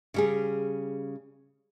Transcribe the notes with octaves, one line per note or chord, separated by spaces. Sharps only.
C#3 G3 G#4